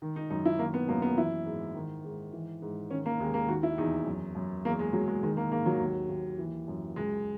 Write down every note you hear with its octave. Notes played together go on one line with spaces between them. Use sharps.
D#3
D#4
F#2 D#4
E4
D#3 A#3
B3
F#2 A#3
B3
E3 E4
G#2
D#3
G#2
E3
G#2
D#3 C#4
A#3
D#2 G#3
A#3
D#3 F#4
E4
E2 D#4
F#2
F#2
E2 A#3
G#3
E2 F#3
G#3
D#3 G#3
A#3
G#2 A#3
F#3
D#2
D#2
E3
F#2
C#2 G#3